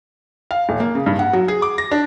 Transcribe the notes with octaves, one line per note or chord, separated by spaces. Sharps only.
F5
D#1
A#3
C#3
G2
F#5
F#3
G#4
D6
A#6
D4